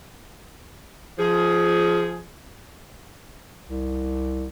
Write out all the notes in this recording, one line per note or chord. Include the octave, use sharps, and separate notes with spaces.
F3 G#4
C2